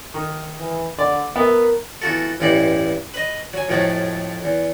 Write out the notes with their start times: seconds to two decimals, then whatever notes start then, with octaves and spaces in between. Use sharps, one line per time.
0.14 D#3
0.59 E3
0.99 D3 D5
1.36 B3 A#4 E5
2.02 E3 B3 F4 F#4 A4
2.40 A1 E2 G2 D#4 E4 D5
3.14 B4 D#5
3.53 F#3 G#5
3.69 F2 A2 F3 F#3 G#3 A3
4.44 E2